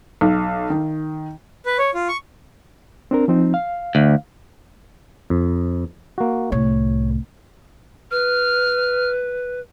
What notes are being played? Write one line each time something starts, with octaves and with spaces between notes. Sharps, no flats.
B1
D#3
B4
C#5
F4
C#6
C4 D4 A#4
F3 C4 D#4
F5
D2
F2
A#3 F#4
C2 A2 C#5
B4 F6